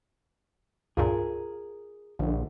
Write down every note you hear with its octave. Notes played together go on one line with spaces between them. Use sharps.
C#2 G2 A#2 F4 G#4 A#4
A#1 D3